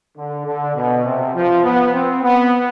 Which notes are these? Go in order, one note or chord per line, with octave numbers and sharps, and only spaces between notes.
D3
D3
B2
C3
F3
B3
C4
B3